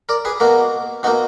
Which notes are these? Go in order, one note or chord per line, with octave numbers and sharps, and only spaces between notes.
A#4 D5
G#4 B4
B2 A#3 F#4 A#4
B2 A#3 D#4 F#4